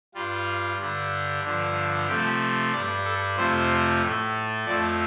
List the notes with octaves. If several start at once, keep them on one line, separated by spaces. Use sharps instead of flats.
G2 G3 F4
G2 D3 G3
G2 D3 F3
C3 F3 A3 G4
G2 G3 D5
A4
F2 C3 F3 A3 C5
A2 A3
F2 F3 A3 D5